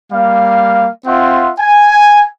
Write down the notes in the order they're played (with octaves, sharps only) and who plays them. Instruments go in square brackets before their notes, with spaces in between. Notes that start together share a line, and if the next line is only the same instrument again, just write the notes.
[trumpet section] G3 A#3 F5
C4 F4 E5 F#5 C6
G#5